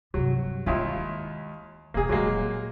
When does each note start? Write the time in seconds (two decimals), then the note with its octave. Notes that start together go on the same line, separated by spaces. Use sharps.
0.14 G2 C3 F#3
0.66 D#2 D#3 G#3 E4 F4
1.94 E1 E3 A#3 G#4
2.09 A#2 F#3 G#3 A#3